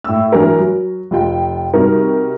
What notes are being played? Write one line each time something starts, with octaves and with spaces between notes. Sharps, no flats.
A2 E6
E3 F#3 D4 A#4
F#3
F1 F4 G5
C3 G3 D#4 F#4 A#4